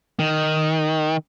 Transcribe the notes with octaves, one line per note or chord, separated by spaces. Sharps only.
D#3